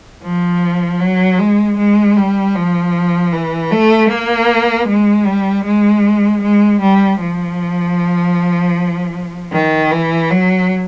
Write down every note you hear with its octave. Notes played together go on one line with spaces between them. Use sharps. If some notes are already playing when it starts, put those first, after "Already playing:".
F3
F#3
G#3
G#3
G3
F3
E3
A3
A#3
G#3
G3
G#3
G#3
G3
F3
D#3
E3
F#3